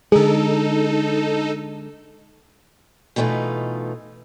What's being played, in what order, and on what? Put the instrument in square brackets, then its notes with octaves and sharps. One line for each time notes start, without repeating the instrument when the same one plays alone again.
[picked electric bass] D3 G#3 [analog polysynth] D#4 A4 [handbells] G#4
[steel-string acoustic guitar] B2 E3 A3 D#4 F4